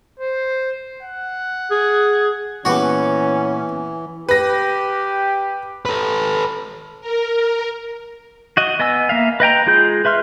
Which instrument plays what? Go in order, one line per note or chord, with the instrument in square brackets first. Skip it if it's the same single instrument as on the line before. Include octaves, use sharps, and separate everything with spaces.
[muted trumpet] C5
F#5
[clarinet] G#4
[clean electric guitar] A#2 B3 B4 [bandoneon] E3 [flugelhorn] C#4 [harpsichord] F#4 G4
[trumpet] G4 [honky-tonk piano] B4 A#6
[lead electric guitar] A4 B4
[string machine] A#4
[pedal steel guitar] F#4 D#5
B3 D#5 G#5 E6
A#3 E5 F5
B4 D#5 G5 A#5
G#3 F4 G#4 G6
B4 E5 C6 F6